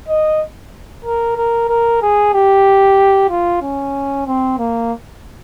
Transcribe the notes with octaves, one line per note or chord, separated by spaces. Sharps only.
D#5
A#4
A#4
A#4
G#4
G4
F4
C#4
C4
A#3